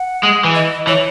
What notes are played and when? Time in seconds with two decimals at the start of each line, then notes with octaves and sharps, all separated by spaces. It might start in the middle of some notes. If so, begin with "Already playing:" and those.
Already playing: F#5
0.23 G#3
0.44 E3
0.55 D#5
0.87 E3 C#5